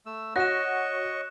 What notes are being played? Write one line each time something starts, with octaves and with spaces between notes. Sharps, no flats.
A3 E6
F#4 C#5 D#5 C#6 F#6 A#6 E7